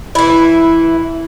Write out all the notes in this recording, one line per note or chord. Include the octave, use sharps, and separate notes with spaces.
E3 E4